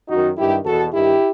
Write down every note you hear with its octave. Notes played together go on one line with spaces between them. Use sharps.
F#2 D#3 D#4 F#4
G2 D#3 E4 G4
E2 B2 F#4 A4
G2 D#3 E4 G4